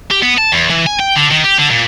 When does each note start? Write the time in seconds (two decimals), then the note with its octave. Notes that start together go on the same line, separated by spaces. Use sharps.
0.11 G4
0.22 B3
0.38 A5
0.52 E2
0.70 E3
0.87 G#5
1.00 G5
1.16 D3
1.31 D#3
1.44 G4
1.58 D3
1.70 A#2